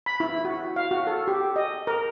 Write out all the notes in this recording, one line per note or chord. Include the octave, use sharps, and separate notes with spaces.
B5
E4
F#4
F5
F#4
A4
G4
D#5
A#4